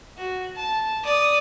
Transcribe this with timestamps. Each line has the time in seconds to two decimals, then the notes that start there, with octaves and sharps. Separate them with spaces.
0.17 F#4
0.56 A5
1.04 D5 D#6